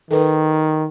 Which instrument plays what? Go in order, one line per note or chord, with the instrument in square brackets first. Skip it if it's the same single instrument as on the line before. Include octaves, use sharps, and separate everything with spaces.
[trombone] D#3 [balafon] A4 B4